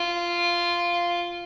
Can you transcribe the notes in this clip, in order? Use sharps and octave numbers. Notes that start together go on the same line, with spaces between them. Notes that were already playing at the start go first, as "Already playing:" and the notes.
Already playing: F4